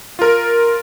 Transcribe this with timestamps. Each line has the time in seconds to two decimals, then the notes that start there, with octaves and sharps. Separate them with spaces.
0.19 F4 A#4